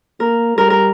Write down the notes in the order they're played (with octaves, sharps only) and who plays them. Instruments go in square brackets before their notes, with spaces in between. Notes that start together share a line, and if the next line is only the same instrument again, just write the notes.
[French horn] A#3 [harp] A#4
[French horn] G3 [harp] A#4
[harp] A#4